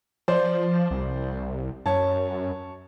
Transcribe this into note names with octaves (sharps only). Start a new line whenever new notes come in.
F3 C5 D5
C2
F#2 C#5 A5